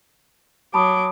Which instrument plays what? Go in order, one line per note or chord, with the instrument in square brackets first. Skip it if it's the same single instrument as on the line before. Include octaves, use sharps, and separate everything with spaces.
[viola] F#3 D6 [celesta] A5 B5 D#6